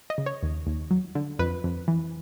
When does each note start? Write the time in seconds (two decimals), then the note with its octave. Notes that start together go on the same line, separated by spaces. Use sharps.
0.10 D#5
0.18 C#3
0.26 C#5
0.43 D#2
0.67 D#2
0.91 F#3
1.15 D3
1.39 F2 B4
1.64 F2
1.88 E3